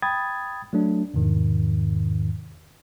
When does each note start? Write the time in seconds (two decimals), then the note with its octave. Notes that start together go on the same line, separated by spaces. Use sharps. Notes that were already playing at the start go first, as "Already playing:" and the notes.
0.02 G5 B5 D#6 G#6 A6
0.73 F#3 A3 D4
1.14 E2 G#2 C3 D#3